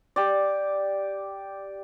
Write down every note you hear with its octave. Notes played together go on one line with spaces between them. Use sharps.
G4 D5